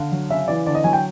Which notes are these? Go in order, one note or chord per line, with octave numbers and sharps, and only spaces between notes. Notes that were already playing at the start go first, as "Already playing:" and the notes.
Already playing: D3 F5
F#3
C#3 E5
E3 D5
D3 D5
D#5
F#3 G#5
G5